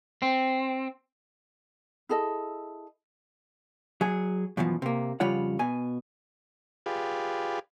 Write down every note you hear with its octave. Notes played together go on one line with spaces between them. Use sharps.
C4
E4 G#4 A4 D#5
F#3 G#4
F#2 B2 E3 F3
C3 A#3
F2 C#3 G3 F4 C#5 F#5
B2 G#5
F4 G4 G#4 B4 D5